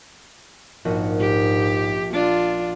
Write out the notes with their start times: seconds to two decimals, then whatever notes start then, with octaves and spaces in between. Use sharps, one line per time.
0.85 A#1 G#2 F#4 D#5
1.20 G4
2.13 D4 F4